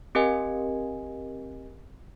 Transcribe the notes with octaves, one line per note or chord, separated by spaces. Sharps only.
C4 G4 A#4 D#5 G#5